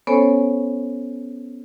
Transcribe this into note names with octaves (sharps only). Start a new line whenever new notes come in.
B3 C#4 A4 C5 C#5 G#5